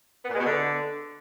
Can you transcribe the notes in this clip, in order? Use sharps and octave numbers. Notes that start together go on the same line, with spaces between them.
B3
A#2
G#3
B2
D3